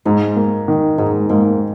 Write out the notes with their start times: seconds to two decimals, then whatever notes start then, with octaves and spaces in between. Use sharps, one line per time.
0.05 G#2 G#3
0.36 A#3
0.68 D#3
0.98 G#2 G#3
1.29 G#2 A#3